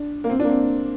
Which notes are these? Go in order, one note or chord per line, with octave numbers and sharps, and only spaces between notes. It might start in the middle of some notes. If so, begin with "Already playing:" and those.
Already playing: D4
A#3
C4
D4
A#3
C4